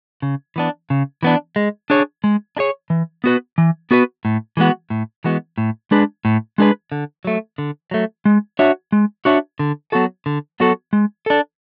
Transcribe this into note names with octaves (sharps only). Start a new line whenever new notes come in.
C#3
E3 B3 D4
C#3
E3 B3 D4
G#3
D4 G#4 C#5
G#3
D4 G#4 C#5
E3
B3 F#4 B4
E3
B3 F#4 B4
A2
E3 G#3 B3 F#4
A2
E3 G#3 B3 F#4
A2
G#3 D4 G#4 B4
A2
G#3 D4 G#4 B4
D3
F#3 A3
D3
F#3 A3
G#3
D4 F#4 C#5 E5
G#3
D4 F#4 C#5 E5
D3
F#3 B3 F#4 A4
D3
F#3 B3 F#4 A4
G#3
D4 A4